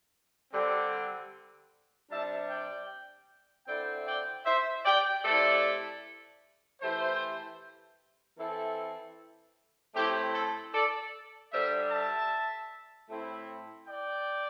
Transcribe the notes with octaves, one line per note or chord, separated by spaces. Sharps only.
D3 G3 C4
C3 G3 D4 E5 A5
D5 G5
D3 C4 E4 D5 G5
D5 G5
C5 E5
D5 G5
C3 A3 E4 A4 D5
E3 A3 E4 G4 C5
E3 C4 E4 A4
A2 A3 C4 E4 G4
A4
A4 D5
D3 G3 D4 C5 E5
E5 A5
A2 A3 C4 E4
D5 G5